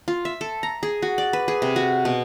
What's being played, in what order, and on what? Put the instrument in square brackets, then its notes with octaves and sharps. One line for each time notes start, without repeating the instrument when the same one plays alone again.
[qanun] F4
E5
A4
A#5
G#4
F#4
D5
B4
G#4
C3
F#4
B2